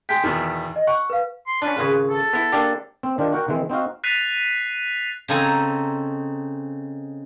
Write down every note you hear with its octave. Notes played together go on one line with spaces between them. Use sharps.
G#3 G5 B6
E2 B2 D#3
D#5
F#5 C#6
B4 F5
C6
C#4 D4 F4 B4
G#1 C#3 F4 G#4
A4
B3 E4
A#3 D4 G4
C4
D#3 D4 F4 G4
F#4 A#4 F#5 G5
D#3 E3 G#3 C4
C4 D#4 F#4 F5
F#6 A6 B6 C7 D#7 F7
C#3 C4 D#4 A4 G#5 A#5